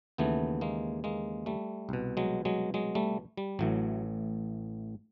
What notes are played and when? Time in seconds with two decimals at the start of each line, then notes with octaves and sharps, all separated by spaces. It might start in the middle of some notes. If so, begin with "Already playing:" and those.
0.18 D#2 C#3 E3 A3 B3
0.61 G#3 A#3
1.04 G#3 A#3
1.46 G3 A3
1.89 C2 B2
2.17 F#3 G#3
2.45 F#3 G#3
2.74 F#3 G#3
2.95 G3 A3
3.37 G3
3.59 A1 A2 E3 F#3